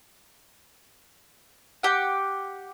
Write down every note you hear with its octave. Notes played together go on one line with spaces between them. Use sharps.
G4 F#5